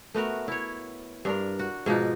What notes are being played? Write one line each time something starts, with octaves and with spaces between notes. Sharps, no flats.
A3 B3 F#4 A#4
E4 C#5
G2 D4 A#4
F#4
G#2 B2 F3 D#4